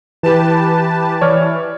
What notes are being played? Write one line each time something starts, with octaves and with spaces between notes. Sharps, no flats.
E3 G4 B4 A5 E7
E3 C#5 D5 F6